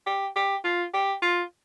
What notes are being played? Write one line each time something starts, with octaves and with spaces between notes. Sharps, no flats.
G4
G4
F4
G4
F4